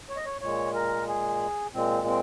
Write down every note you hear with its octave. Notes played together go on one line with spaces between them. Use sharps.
C#5
D#5
C#5
A#2 G#3 C#5
A#4
G#4
A#2 G#3 C4
C4